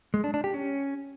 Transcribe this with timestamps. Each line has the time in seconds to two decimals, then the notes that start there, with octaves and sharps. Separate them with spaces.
0.14 G#3
0.24 D4
0.34 D4
0.44 G4
0.54 C#4